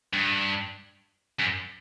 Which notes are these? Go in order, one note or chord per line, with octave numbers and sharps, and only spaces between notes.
G2
F#2